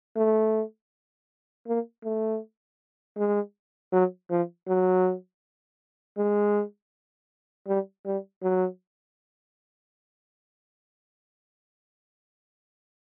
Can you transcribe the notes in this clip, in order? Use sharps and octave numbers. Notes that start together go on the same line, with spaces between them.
A3
A#3
A3
G#3
F#3
F3
F#3
G#3
G3
G3
F#3